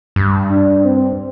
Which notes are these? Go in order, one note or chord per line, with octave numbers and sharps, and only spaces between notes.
G2
D4
C4